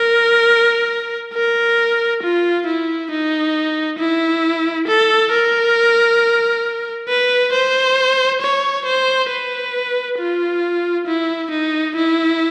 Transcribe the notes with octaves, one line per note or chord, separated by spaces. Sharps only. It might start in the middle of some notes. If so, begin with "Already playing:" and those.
Already playing: A#4
A#4
F4
E4
D#4
E4
A4
A#4
B4
C5
C#5
C5
B4
F4
E4
D#4
E4